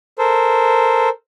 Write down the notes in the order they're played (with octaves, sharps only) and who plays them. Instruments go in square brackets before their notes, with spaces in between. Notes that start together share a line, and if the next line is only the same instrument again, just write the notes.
[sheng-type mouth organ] A4 A#4 C5